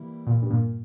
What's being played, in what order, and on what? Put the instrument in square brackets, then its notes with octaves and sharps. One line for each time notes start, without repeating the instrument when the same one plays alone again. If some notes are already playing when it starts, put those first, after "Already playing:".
Already playing: [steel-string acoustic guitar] E3 G3 A#3 E4
[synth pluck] A#2
G2
A#2